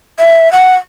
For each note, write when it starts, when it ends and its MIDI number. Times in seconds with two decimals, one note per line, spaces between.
0.19 0.51 76
0.53 0.76 78